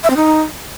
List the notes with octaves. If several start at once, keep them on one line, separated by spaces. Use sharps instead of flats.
E5
C4
D#4